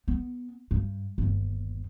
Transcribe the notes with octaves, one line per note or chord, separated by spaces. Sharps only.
B3
G2
G1 D#2